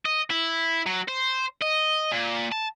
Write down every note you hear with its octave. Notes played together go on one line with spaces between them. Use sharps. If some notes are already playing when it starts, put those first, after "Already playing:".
D#5
E4
F#3
C5
D#5
A#2
A5